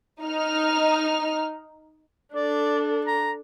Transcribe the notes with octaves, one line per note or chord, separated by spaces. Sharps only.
D#4 F6
D4 A4 D5
A#5